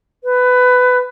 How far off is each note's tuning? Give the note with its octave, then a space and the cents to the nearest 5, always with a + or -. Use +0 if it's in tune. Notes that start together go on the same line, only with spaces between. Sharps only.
B4 +15